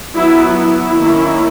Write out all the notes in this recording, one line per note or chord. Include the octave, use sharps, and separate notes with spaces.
F#3 B3 E4
E4
D#3 A#3 C#4